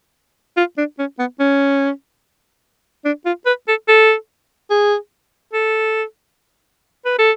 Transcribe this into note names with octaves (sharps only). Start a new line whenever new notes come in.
F4
D4
C#4
B3
C#4
D4
F4
B4
A4
A4
G#4
A4
B4
A4